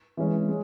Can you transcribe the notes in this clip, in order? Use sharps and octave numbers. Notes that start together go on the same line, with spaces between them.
E3 G#3 C#4
G#3